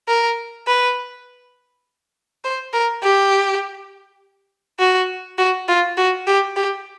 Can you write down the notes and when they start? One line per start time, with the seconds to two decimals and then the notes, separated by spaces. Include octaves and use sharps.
0.08 A#4
0.67 B4
2.44 C5
2.73 A#4
3.03 G4
4.79 F#4
5.38 F#4
5.68 F4
5.97 F#4
6.27 G4
6.56 G4